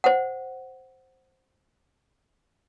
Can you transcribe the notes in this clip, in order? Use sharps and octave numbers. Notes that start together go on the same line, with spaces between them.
C5 F#5